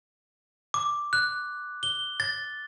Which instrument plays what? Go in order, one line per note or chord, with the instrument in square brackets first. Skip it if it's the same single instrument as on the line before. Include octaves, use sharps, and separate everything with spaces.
[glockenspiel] D6
F#6
G7
A6